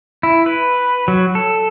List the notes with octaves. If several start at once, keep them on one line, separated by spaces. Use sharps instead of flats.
E4
B4
F#3
A4